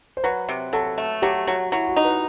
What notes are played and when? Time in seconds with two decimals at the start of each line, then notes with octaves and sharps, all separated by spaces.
0.17 C5
0.24 F#3 B4
0.49 C3
0.73 F#3 A4
0.98 A3
1.22 F#3 G4
1.47 F#3 F#4
1.72 F#3 E4
1.89 F#4
1.96 D#4
2.05 B4